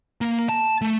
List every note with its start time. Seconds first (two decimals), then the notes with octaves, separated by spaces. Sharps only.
0.21 A#3
0.49 A5
0.82 A3